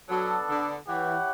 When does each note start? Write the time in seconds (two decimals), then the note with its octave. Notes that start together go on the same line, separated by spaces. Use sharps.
0.09 F#3 B3 D4 A4
0.49 D3
0.88 E3 E4 G4 C#5 F#5